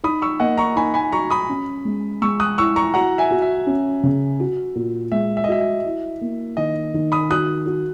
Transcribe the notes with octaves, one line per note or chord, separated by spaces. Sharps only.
D#4 B5 D#6
C#6 E6
A#3 D#5 F#5
A#5 C#6
D#4 G#5 B5
G#5 B5
F#4 A#5 C#6
B5 D#6
C#4
G#3
G#3 C#6 E6
D#6 F#6
E4 C#6 E6
A#5 C#6
F#4 F#5 A#5
E5 G#5
F#4
E5
C#4
C#3
F#4
A#2
G#3 E5
E5
D#5
F#4 E5
E5
E4
A#3
D#3 D#5
D#3
B5 D#6
F#4 D#6 F#6
F#4